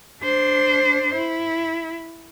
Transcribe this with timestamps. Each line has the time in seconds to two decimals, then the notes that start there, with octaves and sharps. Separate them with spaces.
0.23 D4 C5
1.14 E4